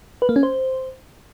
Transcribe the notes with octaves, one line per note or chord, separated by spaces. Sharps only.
B4
A#3
C#4
C5